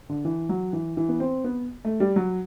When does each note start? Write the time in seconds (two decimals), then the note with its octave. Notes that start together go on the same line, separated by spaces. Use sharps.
0.09 D3
0.25 E3
0.49 F#3
0.73 E3
0.97 E3
1.09 B3
1.20 C4
1.44 B3
1.85 A3
2.00 G3
2.16 F#3